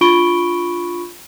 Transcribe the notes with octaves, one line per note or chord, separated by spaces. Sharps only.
D4 F4 B5 C#6 D7 G7